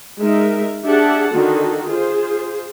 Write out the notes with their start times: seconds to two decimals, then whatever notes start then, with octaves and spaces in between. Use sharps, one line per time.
0.20 G#3 D#4 A#4 E5
0.84 D4 G4 G#4 E5 F#5 A5
1.30 D3 D#3 F#4 A4
1.88 F4 G#4 C5